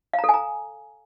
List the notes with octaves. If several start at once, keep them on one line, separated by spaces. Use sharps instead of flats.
F5
A#5
A4
G#5
A#5